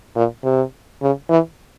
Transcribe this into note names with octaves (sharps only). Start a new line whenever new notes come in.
A#2
C3
C#3
E3